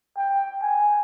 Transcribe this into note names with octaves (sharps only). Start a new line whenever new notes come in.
G5
G#5